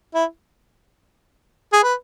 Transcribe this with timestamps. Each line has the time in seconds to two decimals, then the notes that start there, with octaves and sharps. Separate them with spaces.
0.14 E4
1.72 G#4
1.83 B4